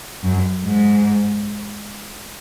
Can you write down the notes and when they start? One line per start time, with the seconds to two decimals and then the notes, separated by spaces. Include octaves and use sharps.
0.23 F#2
0.64 G#2